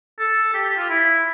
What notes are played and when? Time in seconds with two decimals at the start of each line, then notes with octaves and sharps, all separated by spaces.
0.19 A4
0.54 G4
0.66 G4
0.77 F4
0.89 E4